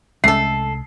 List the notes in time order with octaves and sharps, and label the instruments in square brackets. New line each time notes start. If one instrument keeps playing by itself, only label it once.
[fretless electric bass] C2 G#3 C#4 [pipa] A3 A4 [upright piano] C7